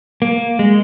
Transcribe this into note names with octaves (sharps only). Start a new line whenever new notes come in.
A#3
G#3